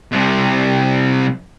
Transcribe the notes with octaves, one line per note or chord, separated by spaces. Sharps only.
C2 C3